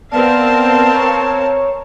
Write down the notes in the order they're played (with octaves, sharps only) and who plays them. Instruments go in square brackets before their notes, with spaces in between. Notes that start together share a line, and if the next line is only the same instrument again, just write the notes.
[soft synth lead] B3 [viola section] C4 A#4 F5 [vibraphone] B4 D5 [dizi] A5
[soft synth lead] C#5 [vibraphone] A#5